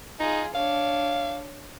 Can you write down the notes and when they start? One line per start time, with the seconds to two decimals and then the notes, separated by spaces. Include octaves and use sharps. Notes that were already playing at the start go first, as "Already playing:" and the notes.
0.20 D#4 F4 G#4
0.55 D4 C#5 F5